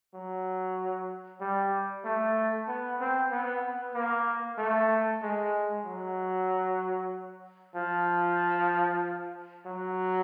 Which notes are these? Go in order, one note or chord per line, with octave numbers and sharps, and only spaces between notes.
F#3
G3
A3
B3
C4
B3
A#3
A3
G#3
F#3
F3
F#3